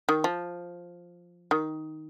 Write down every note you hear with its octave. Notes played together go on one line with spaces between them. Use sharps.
D#3
F3
D#3